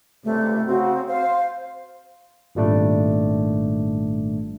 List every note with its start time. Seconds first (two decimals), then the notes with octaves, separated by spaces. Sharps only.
0.25 C#2 G2 C3 A3
0.66 C#3 C4 F#4
1.08 C5 F5
2.55 G#1 A#2 G3 A3 D4